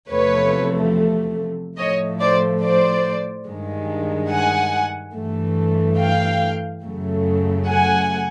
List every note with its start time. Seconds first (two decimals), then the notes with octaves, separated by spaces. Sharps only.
0.10 E2 C3 F3 A3 B4 C#5
1.78 A2 F3 A3 C#5 D#5
2.20 C5 D5
2.62 C5 D5
3.46 G2 D#3 G#3
4.30 F#5 G#5
5.14 G2 E3 A3
5.98 F5 G5
6.82 F#2 C#3 F#3 A3
7.66 F#5 G#5